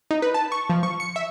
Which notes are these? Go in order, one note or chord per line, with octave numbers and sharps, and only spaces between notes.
D#4
B4
A5
C#6
F3
C#6
C#7
E5